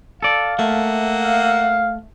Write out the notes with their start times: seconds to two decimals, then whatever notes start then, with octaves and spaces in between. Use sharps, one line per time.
0.22 A4 D5 F5
0.59 A3 A#3 E5 F#5
1.23 F5